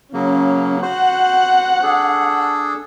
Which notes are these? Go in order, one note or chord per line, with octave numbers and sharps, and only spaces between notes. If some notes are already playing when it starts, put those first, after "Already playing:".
C#3 F#3 A#3 C#4
F#4 C5 F#5
D4 G#4 A4